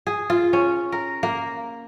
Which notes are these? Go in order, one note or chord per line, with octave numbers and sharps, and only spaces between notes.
G#4
F4
C#4
A#4
A#3